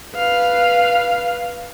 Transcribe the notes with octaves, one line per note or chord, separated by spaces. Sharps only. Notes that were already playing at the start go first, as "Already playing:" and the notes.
B4 F5